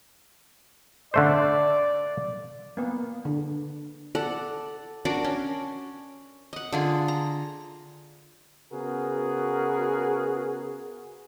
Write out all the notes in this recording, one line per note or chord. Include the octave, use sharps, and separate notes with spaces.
D3 A3 C5 D5
A#3 B3
D3
A4 D5 F#5
D4 F#4 A#4 D5
C#4
D#5 F#5
D3 F4 G#4
A#5
C#3 B3 F#4 G#4 A#4